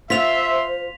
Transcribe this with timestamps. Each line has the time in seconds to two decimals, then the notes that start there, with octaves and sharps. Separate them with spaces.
0.10 F4 C5 E5 C6 B6 F7